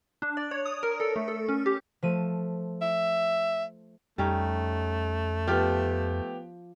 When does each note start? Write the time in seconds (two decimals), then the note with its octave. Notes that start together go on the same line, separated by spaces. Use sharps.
0.22 D4
0.37 D5
0.51 C#5
0.66 D#6
0.83 A#4
1.00 A4
1.16 A3
1.28 A4
1.49 C#4
1.66 G4
2.02 F3 A3 D#7
2.81 E5
4.18 F2 G3 A3 C#4 D#4
5.47 F3 B3 F4 G4